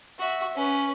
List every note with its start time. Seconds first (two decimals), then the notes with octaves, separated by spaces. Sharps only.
0.19 F#4 E5
0.55 C#4 B4